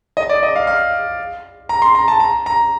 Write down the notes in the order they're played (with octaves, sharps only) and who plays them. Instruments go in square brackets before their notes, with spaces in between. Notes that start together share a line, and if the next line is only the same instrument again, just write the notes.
[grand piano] D#5
D5
D#5
F5
F5
A#5
C6
A#5
A5
A#5
A#5